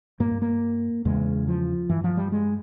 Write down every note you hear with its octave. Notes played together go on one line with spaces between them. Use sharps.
G2 A#3
A#3
E2 C#3 G#3
F3
G2 E3
F3
G3
G#3